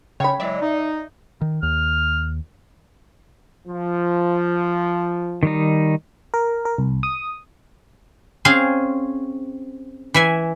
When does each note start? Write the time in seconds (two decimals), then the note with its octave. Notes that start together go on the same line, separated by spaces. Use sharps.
0.20 C#3 C#5 G5 B5
0.40 E3 F#3 G#3 D5 E5
0.61 D#4
1.41 D#3
1.63 D#2 F6
3.68 F3
5.43 D#3 G3 D#4
6.34 A#4
6.65 A#4
6.78 C2
7.03 D#6
8.45 C4 C#4 G#4 F5 G#5
10.14 E3 E5 G#5